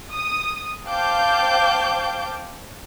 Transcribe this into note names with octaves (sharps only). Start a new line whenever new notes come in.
D#6
C5 F5 G5 A5 D6 G6